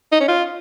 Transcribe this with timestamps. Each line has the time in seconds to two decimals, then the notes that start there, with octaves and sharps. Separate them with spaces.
0.12 D#4
0.20 C#4
0.28 F4